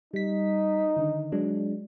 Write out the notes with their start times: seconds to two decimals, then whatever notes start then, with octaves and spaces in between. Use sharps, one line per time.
0.14 G3 D#4 B6
0.97 D3 D#3
1.32 F#3 G#3 D4